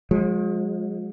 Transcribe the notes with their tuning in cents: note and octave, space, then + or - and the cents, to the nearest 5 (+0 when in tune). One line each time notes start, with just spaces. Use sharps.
F3 +45 G#3 +0